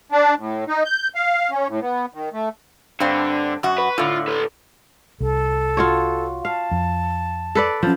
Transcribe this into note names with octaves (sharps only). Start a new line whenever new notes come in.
D4
A2
D#4
G6
F5
C#4
A2
B3
D#3
A3
G2 D3 C4
F#2 F#4
B4
A2 D3 F4
A4 B4
C2 A4
F4 F#4 C#5
F5 A5
F2
A4 B4 D5
F3 F#3 C#4 A5